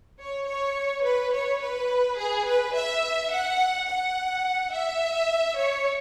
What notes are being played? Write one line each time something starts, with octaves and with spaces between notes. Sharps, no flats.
C#5
C#5
B4
C#5
B4
G#4
B4
E5
F#5
F#5
E5
C#5